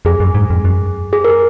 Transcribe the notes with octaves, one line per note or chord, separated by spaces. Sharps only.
F2 G#4
F#2
G#2
F2
F#2
G#4
A#4